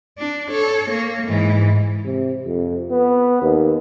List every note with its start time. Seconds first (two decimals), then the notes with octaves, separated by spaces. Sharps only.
0.18 D4
0.50 A4 C#5
0.90 A#3
1.27 G#2 E3
2.05 C3
2.46 F2
2.91 B3
3.42 D#2